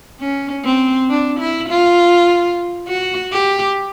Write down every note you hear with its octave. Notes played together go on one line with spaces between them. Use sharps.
C#4
C4
D4
E4
F4
F#4
G4